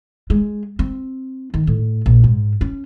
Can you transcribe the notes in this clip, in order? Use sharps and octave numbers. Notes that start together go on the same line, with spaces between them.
G#3
C4
D#3
A2
A#1
G#2
C#4